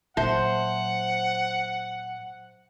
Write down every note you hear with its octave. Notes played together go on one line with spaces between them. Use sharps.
A#2 F#3 C5 E5 F#5 A5